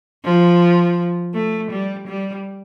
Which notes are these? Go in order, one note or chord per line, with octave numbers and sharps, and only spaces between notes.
F3
A3
G3
G3